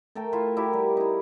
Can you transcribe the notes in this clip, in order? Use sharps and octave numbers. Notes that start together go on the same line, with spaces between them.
A3 A4 A#4 G5
E4 F4 E5
E4 F#4 G4 A#4
G3
D#4 E4